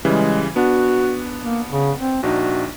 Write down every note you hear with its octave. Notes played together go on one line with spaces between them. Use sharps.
C#3 E3 G3 G#3
B3 D4 F#4
A#3
C#3
C4
A#1 D4 D#4 F#4